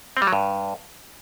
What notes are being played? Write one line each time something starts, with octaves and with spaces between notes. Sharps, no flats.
C4
G3
F#3
G2